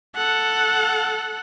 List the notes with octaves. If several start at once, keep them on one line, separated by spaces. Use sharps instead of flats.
A4 F#5